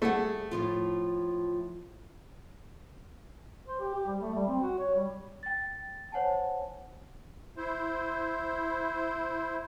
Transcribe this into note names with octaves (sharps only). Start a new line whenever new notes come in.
G3 A3 G#4 F#5
A2 F3 F4
C5
G4
G4
G3
A3
G3
C4
F#4
C#5
G3
G5 A6
C5 C#5 F#5 G#5 A5
E4 C5